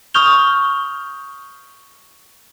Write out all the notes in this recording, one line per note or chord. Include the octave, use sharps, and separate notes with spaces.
C#6 D#6 F6 G6 F7 G7